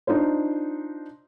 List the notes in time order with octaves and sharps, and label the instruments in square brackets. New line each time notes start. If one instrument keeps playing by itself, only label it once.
[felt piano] D4 D#4 F4 C5